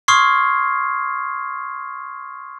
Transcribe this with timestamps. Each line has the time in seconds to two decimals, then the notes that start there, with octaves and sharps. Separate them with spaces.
0.08 C6 C#6 D#6 F6 G#6 C7